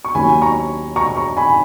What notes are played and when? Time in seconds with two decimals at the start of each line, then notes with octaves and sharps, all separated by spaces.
0.05 C#6
0.15 D#2 D#3 F#3 A#3 C#4 G#5 B5
0.42 A#5 C#6
0.96 A#5 C#6
1.17 A#5 C#6
1.37 G#5 B5